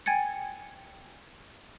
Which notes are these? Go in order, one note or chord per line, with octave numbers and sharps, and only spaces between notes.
G5 G#5 G#6 A6 C#7